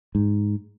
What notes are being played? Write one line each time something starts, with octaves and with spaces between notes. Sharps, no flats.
G#2